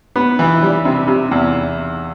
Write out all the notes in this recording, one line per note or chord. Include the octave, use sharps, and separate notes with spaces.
B3
E3
G3
C3
C3
E2